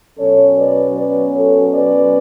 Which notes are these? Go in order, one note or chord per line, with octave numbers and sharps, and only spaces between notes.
B2 F#3 C#4 A4 C#5
B4 D5
B4 D5
A4 C#5
B4 D5